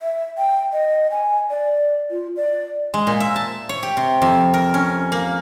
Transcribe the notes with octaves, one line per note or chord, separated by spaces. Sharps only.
E5
G5
D#5
G#5
D5
F4
D5
G#3
A#2
E5
A5
C#5
G4
C3
F2
A#4
C#4
A#3